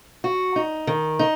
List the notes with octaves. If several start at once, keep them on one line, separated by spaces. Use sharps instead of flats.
F#4
D#4
D#3
D#4